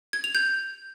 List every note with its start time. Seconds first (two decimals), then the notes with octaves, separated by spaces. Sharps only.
0.13 G#6
0.24 F7
0.35 G6